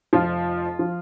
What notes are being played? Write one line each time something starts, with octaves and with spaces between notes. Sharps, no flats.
F1 F2 F3 F4
F3